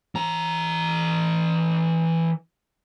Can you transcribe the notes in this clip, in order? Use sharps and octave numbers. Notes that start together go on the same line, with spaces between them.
E3 A#5